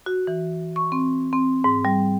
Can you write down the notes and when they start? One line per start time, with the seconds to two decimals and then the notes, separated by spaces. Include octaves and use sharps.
0.06 F#4
0.27 E3
0.76 C#6
0.92 C4
1.33 C4
1.64 G#2
1.85 G3